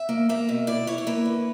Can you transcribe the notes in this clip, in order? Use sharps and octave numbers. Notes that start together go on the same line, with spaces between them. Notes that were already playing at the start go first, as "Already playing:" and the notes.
Already playing: E5
A#3
A#3 E5
B2
E4 D5
E4 C#5
C#5
A#3 B4
D3